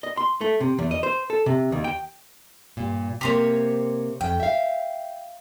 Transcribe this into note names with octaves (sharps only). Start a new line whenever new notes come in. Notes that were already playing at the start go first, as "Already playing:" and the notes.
D#5
C6
A3
C3
E2
D#5
C5
A4
C3
D#2
G5
G2 A#2
C3 A#3 G4 C5 C#5
F2 G5
E5 F5